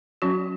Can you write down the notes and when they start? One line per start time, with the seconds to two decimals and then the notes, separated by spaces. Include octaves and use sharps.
0.22 F#3 C#4 F#4